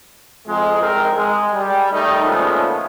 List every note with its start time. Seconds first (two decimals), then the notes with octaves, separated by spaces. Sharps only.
0.48 F2 G#3
0.80 C2 D#3 G#3 C4 A#4
1.15 G#3
1.54 G3
1.92 D#3 G3 A3 D#4
2.23 A#2 C#3 F3 G#3 A3 B3